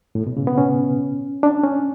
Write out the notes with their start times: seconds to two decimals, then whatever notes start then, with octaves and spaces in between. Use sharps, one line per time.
0.15 A2
0.27 B2
0.37 C#3
0.47 B3
0.58 C#4
1.43 D4
1.64 C#4